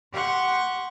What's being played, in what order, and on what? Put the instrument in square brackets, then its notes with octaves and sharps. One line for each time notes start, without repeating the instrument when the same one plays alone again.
[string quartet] G4 F#5 C6 C#6 F#6